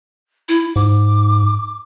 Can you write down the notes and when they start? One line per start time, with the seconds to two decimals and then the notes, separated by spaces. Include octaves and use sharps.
0.49 E4
0.76 G#2 D6